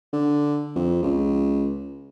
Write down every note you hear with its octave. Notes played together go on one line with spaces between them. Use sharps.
D3
F2
C#2